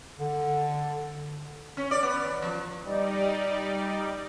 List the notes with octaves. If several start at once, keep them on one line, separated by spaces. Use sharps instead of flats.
D3
C#4
D5
B3
E2
F3
G3 D#4 D5